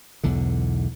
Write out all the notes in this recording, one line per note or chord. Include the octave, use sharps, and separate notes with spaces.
B1 E2 D3